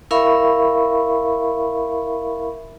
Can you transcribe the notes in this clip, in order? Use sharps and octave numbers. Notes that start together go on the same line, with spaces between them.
E4 A#4 E5 F5 B5 C#6